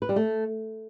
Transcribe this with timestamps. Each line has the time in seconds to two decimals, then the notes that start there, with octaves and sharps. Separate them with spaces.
0.02 B4
0.09 G3
0.16 A3